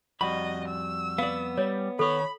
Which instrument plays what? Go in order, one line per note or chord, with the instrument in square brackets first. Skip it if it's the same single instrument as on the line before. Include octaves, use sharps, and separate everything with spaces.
[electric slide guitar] F2 G3 F#4 [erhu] D#5 [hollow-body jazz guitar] B5
[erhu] E6
[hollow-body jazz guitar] B3 D5 [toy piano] F5
[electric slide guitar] G3 [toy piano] C#5
[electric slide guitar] D#3 C#5 [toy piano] A4 [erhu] B5